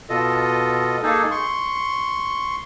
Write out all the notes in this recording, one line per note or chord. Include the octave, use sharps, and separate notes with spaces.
B2 F4 A4 D#5
A#3 D#4 G#4 A4
C6 C#6